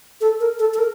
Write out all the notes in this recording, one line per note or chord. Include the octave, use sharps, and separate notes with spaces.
A4
A#4
A4
A4
A#4